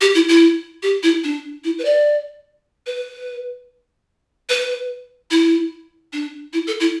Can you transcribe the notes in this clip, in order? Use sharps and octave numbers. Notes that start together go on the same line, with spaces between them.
G4
E4
E4
G4
E4
D4
E4
B4
D5
B4
B4
E4
D4
E4
A4
E4